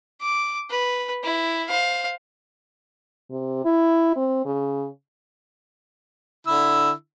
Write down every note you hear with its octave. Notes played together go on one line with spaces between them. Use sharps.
D6
B4
E4
C5 F5
C3
E4
C4
C#3
D3 E4 E6